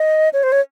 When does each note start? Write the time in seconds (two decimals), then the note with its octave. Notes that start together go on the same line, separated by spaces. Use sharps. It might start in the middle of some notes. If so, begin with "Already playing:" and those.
Already playing: D#5
0.33 C#5
0.43 C5
0.52 C#5